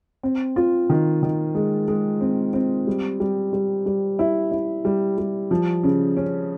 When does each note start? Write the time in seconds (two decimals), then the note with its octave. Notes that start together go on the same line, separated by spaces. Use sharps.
0.23 C4
0.56 F4
0.90 D#3
1.23 D#3
1.55 G#3
1.88 G#3
2.21 C4
2.53 C4
2.87 G3
3.20 G3
3.53 G3
3.86 G3
4.19 E4
4.51 E4
4.85 G3
5.18 G3
5.51 F3
5.83 C#3
6.17 C#4